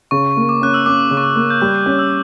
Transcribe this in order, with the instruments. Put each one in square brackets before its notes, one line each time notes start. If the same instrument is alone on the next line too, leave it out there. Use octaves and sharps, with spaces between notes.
[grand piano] C#3 [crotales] C#6
[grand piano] A#3
[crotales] D6
[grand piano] C#4 [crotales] F#6
[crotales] E6
[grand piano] C#4 [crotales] D6
[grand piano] C#3
[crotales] C#6
D6
[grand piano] A#3
[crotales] G6
[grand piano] G3 [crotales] F#6
[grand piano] C#4
[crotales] E6